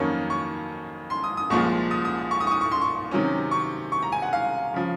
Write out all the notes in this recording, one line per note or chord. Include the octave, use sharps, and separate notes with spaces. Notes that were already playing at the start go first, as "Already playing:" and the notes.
Already playing: F2 D#3 F#3 A#3 C#4 C#6
C#6
C6
D#6
D#6
C2 A#2 F3 G#3 C#6
D#6
D#6
C#6
D#6
C#6
D#6
C#6
C6
C#6
C3 D#3 F#3 C#4
C#6
C#6
A#5
G#5
F#5
F5
C#3 F3